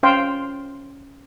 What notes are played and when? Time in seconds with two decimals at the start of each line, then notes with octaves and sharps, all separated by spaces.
0.03 C#4 C5 F5 G5 C6